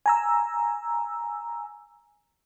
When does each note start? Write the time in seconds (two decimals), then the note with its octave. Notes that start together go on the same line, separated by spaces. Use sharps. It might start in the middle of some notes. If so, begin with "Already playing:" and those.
0.06 G#5 A#5 E6